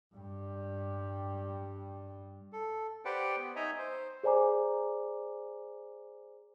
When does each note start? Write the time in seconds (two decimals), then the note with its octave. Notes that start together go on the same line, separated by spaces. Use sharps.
0.15 G2 G3
2.53 A4
3.05 G4 B4 C5 D5 F#5 G5
3.38 B3
3.56 D#4 C#5 D#5 E5 G#5 A#5
3.78 C5
4.23 G#4 C5 D5 G#5 A#5 D6